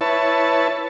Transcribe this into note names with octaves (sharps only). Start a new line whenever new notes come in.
E4 B4 C#5 A5